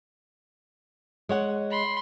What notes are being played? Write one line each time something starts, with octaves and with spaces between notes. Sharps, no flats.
G#3 C#5 F#5
B5 C6